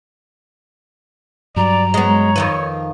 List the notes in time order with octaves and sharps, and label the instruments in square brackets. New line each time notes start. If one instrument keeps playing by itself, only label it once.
[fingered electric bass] G2 F#3 [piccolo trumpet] D5 [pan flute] A#5
[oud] G#3 B3 [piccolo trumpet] C#5
[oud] F2 D#3 B4